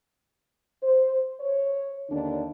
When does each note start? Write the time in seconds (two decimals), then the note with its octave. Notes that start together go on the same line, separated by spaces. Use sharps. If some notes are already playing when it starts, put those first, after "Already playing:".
0.83 C5
1.40 C#5
2.10 D#2 D3 D4